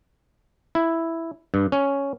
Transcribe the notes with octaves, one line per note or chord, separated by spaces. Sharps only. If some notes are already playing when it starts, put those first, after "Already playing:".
E4
G2
C#4